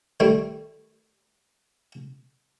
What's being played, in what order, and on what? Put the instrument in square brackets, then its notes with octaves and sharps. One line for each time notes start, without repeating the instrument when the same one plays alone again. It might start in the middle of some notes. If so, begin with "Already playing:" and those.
[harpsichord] D#3 G3 A3